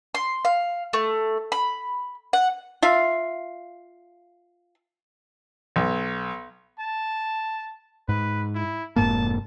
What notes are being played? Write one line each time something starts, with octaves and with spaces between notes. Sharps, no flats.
C6
F5
A3
B5
F#5
F4 E5 F5
B1
A5
G#2 B4
E4
F1 G#2 A#3 A5